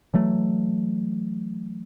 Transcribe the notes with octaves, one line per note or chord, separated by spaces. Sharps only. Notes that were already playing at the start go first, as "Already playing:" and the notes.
E3 F#3 A3